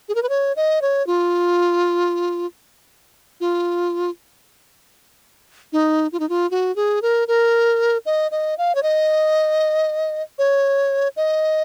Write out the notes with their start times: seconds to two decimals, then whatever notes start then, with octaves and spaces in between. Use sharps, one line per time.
0.09 G#4
0.15 A#4
0.23 B4
0.29 C#5
0.56 D#5
0.82 C#5
1.07 F4
3.40 F4
5.73 D#4
6.12 F4
6.20 D#4
6.29 F4
6.51 F#4
6.76 G#4
7.02 A#4
7.28 A#4
8.06 D#5
8.31 D#5
8.58 F5
8.75 C#5
8.83 D#5
10.38 C#5
11.16 D#5